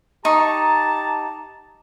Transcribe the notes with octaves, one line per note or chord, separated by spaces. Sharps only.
D#4 G4 A5 A#5 C#6